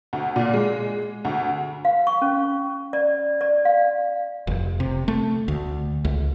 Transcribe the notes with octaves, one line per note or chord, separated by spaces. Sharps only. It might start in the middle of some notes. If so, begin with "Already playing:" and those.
D2
A#2
G#3
D2
F5
C#6
C#4
D5
D5
F5
F1
C3
A3
D2
C#2